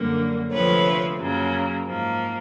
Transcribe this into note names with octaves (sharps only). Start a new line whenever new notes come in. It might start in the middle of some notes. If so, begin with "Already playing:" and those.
Already playing: F#2 D3 G3 A#3
D2 C3 F3 A3 C4 B4 C#5
F#2 C#3 F#3 A#3
G#2 F3 A#3